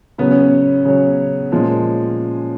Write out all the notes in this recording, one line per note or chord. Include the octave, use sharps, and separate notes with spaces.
C#3 F#3 B3
C#4
B3
C#3 F#3
A#2 F3 G#3 C#4